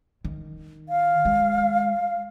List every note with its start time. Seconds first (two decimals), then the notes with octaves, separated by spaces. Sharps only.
0.25 D#3
0.89 F5
1.25 G#3